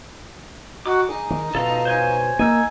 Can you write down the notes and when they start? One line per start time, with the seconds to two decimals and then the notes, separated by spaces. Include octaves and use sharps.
0.86 D#4 F#4 D6
1.09 D#4 G#4
1.30 D#3
1.55 B2 F4 A4 A#5
1.85 C5 C#5 G#5
2.39 A#3 D#4 G#5 E6